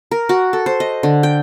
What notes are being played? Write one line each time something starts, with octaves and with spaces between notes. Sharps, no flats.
A#4
F#4
A4
C5
D#5
D3
G5